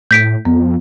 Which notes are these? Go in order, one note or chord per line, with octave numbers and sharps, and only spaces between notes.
A2 G6 B6 D7
F2 B3